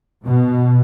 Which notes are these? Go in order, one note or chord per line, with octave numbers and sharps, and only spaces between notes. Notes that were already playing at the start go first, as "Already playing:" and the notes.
B2